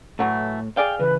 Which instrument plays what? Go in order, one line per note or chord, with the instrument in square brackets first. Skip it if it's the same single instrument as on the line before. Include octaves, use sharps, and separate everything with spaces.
[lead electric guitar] A2 [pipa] E3 F#3 A3
[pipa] G#4 D5 F5 [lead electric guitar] G5
[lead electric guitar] C#3 E3 [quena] B4